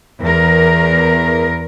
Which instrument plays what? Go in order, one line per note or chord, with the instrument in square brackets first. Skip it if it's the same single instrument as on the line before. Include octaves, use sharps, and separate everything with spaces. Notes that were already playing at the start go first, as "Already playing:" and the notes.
[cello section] E2 A#4